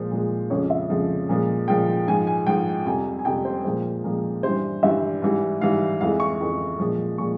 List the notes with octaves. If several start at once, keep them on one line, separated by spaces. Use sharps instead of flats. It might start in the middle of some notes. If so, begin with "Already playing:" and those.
Already playing: A#2 F3 G#3 C5
A#2 F3 G#3
F2 C#3 F3 G#3 C#5
E5
F2 C#3 F3 G#3
A#2 F3 G#3
A#2 F3 G#3 G5
G#2 F3 G#3 G#5
G#5
G#2 F3 G#3 G5
F2 C3 G3 G#5
G#5
F2 C3 G3 G5
C5
A#2 F3 G#3 C5
A#2 F3 G#3 A#4
G2 E3 G3 C5
G2 E3 G3 E5
G#2 E3 G3
G#2 E3 G3 F5
F2 E3 G#3 F5
C#6
F2 E3 G#3
A#2 F3 G#3
A#2 F3 G#3 C#6